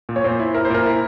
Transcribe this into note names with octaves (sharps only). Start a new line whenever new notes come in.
A#2
C#5
A#2 C5
E4
E4 A#4
C5
A#2 A#4
E4